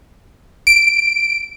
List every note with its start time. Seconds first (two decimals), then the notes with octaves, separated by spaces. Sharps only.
0.67 D7